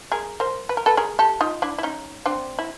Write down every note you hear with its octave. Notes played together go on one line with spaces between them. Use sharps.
G#4 A#4
A#4 C5
B4
A#4
A4 B4
G#4 A#4
G4 A4
D#4 F4
D4 E4
E4
C#4 D#4
C4 D4
E4